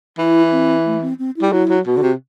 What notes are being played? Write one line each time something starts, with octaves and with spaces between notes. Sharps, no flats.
E3 E4
C4
A3
C4
C4
E4
G3
F#3 E4
F#3
B2 F#4
D3
C3